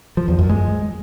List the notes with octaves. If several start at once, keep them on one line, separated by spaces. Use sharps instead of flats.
F3
E2
F#2
G#3